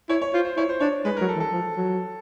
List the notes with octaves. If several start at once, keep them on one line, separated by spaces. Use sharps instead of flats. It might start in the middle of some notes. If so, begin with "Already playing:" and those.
E4 C#5
C#5
F4 C5
C5
E4 C#5
C5
D4 C#5
G#3 B4
F#3 A#4
A4
E3
A4
F3
F#3